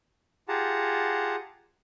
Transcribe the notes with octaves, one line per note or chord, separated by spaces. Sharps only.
F4 G4 G#4 F#5 A5 A#5